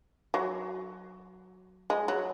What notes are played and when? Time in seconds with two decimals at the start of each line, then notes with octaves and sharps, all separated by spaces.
0.34 F#3
1.90 G#3
2.08 F#3